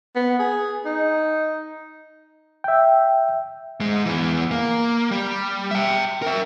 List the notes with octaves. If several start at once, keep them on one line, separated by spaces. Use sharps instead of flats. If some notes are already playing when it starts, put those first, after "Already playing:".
B3
G#4
D#4
E5 G5
G#2 G#3
E2 E3
A#3
G3
E5 G5
A#4 E5